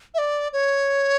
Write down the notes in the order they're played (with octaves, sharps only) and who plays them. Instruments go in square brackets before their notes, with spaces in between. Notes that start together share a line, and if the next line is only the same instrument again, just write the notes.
[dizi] E5
D5
C#5